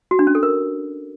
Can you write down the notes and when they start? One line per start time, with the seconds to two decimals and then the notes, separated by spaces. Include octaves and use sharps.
0.11 F#4
0.19 D4
0.27 C#4
0.35 A4
0.43 A#4